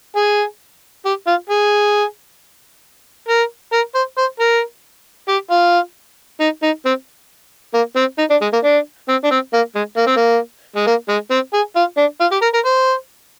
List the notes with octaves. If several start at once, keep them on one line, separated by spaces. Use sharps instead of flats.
G#4
G4
F4
G#4
A#4
A#4
C5
C5
A#4
G4
F4
D#4
D#4
C4
A#3
C4
D#4
D4
G#3
A#3
D4
C4
D4
C4
A#3
G#3
A#3
C4
A#3
G#3
A#3
G#3
C4
G#4
F4
D4
F4
G4
A#4
A#4
C5